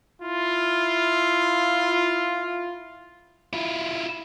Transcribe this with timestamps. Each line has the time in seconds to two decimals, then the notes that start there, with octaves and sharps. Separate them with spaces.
0.21 E4 F4
3.53 E4 F4